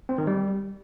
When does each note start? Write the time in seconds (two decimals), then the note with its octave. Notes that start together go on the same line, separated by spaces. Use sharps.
0.09 C4
0.18 D#3
0.27 G3